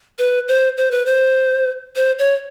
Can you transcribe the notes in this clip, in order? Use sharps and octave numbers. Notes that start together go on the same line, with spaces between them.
B4
C5
C5
B4
C5
C5
C#5